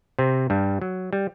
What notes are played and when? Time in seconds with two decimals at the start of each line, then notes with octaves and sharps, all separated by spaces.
0.19 C3 C4
0.50 G2 G3
0.81 F#3
1.13 G3